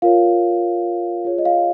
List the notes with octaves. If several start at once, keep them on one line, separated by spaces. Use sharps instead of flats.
F4 A#4 C#5 F5
F4 G#4 C#5
D#5
F5